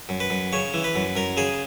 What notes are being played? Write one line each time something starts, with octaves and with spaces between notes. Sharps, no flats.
F#2
B4
F#2
C#3 C#5
E3
B4
F#2
F#2 A#4
C#3 G#4